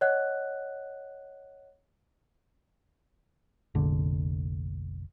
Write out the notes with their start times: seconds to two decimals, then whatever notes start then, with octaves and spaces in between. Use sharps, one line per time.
0.01 C#5 D#5 F#5 F#6
3.75 F1 A#1 D3